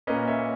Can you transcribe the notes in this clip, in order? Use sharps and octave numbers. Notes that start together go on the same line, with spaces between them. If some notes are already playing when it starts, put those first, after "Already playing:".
A#2 A#3 C#4 B4 D#5
C#5 E5